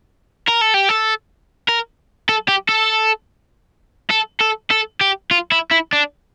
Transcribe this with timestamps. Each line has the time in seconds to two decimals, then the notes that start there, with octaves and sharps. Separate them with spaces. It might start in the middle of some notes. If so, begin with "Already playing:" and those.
0.48 A#4
0.61 A4
0.74 G4
0.89 A4
1.69 A#4
2.29 A4
2.48 G4
2.69 A4
4.10 A4
4.40 A4
4.70 A4
5.01 G4
5.31 F4
5.52 E4
5.71 E4
5.93 D4